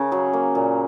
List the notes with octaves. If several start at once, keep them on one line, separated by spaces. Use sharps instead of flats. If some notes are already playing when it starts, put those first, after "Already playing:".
Already playing: C#3 A#4
F#3 G#4
A#3
A#2